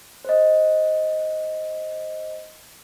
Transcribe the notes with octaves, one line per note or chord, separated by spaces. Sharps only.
C5 D#5